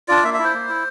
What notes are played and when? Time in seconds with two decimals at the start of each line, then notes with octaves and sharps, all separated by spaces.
0.08 D4 F4 D5
0.23 A#3 E5
0.34 E5
0.39 E4
0.44 C5
0.54 A#3
0.69 E4